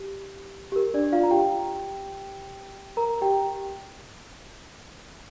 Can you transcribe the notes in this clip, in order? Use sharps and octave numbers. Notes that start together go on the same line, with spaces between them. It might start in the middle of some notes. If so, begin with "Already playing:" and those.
Already playing: G4
G4
A#4
D4 D5
F4 F5
A#5
G4 G5
A#4 A#5
G4 G5